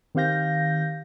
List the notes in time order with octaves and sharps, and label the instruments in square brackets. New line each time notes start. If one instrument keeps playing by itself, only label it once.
[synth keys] D#3 C4 G4 F5 G6 A#6